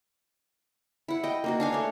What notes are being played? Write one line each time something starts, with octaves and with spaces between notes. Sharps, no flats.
E4 F#5
D#5 G5
A#3 D#4 F#4
D4 F5 G#5
A3 C#5